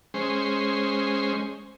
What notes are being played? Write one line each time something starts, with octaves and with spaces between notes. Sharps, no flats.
G#3 C#4 C5